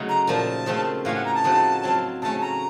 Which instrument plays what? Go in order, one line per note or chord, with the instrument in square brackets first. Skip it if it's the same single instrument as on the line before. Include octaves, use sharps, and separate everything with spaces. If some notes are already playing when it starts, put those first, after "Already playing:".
Already playing: [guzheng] C#3 F#3 A3 D#4
[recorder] A#5
[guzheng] A#2 F3 A#3 [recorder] A5
[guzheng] C#3 F3 A3 C4 F4
[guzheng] A2 A3 C#4 F4 [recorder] F5
[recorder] F#5
A#5
A5
[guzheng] C#3 F3 C4 D#4 F#4
F#3 C4 F4
[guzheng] C#3 A3 C#4 [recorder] A5
[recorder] A#5